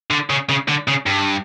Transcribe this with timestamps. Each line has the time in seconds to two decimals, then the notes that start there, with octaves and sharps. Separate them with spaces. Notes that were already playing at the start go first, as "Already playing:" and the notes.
0.11 D3
0.30 C#3
0.49 C#3
0.68 D3
0.88 C#3
1.06 G2